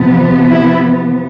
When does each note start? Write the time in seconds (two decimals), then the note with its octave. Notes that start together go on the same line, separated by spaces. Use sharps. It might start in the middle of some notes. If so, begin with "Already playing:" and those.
Already playing: C3 F3 B3
0.49 E4